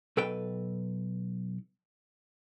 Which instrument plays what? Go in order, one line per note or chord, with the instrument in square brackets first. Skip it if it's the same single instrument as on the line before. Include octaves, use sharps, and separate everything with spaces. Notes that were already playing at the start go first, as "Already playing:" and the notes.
[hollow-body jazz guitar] B1 A4 B4 G5